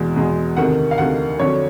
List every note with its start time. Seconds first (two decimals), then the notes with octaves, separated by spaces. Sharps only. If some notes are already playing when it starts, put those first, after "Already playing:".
Already playing: E2 B2 G#3
0.16 E2 B2 G#3
0.57 D2 C3 D#3 F#5
0.91 F5
0.98 D2 C3 D#3 F#5
1.39 F2 D3 F#3 C#5